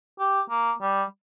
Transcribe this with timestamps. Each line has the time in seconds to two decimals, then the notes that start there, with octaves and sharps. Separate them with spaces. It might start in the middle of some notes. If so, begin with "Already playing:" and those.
0.19 G4
0.50 A#3
0.81 G3